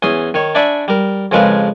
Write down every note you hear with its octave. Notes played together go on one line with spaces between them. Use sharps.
E2 C#4 C6 D#6
D#3 C#5
D4 D5 E5 G#5 B5 C#6
G3 A#4
F2 C#3 F3 G#3 A#4 B4